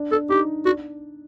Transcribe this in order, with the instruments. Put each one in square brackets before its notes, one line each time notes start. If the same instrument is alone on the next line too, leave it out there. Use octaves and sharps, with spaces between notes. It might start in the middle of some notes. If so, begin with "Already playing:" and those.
Already playing: [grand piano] D4
[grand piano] D4 [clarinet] A4
[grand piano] D#4 [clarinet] G4
[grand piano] D4 [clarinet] F#4